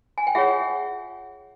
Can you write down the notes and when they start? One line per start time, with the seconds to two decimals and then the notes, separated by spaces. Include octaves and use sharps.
0.18 G#5
0.27 G5
0.35 F4 G#4 C#5 E5 F#5